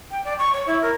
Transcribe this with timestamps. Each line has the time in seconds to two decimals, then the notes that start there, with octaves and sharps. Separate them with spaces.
0.11 G5
0.24 D5
0.39 C#6
0.53 C#5
0.67 E4
0.82 A#4